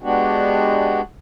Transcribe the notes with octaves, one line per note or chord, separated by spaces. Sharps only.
G#3 B3 D4 F#4 G4